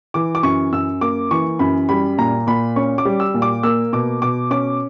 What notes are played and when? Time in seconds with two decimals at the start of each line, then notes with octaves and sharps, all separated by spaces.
0.14 E3 D6
0.35 D6
0.43 F#2 C#6
0.72 F#2 E6
1.01 A#3 D6
1.31 E3 C#6
1.59 F#2 B5
1.89 G3 B5
2.18 A#2 A#5
2.47 A#2 B5
2.76 C#4 C#6
2.98 D6
3.05 G3
3.20 E6
3.34 A#2
3.42 D6
3.63 A#3 E6
3.93 B2 D6
4.22 B2 D6
4.51 C#4 D6